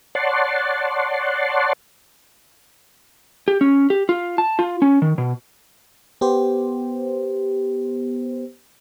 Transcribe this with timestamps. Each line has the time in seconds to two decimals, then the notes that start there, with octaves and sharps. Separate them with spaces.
0.15 C#5 D5 F#5 A5 C6
3.48 G4
3.61 C#4
3.90 G4
4.09 F4
4.38 A5
4.59 F4
4.82 C#4
5.02 D#3
5.18 B2
6.21 B3 G4 C5